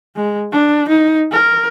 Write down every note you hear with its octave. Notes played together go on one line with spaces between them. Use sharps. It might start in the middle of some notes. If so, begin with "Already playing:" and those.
G#3
D4
D#4
A#4